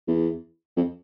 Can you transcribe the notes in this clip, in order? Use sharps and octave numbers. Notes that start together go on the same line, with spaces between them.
E2
F2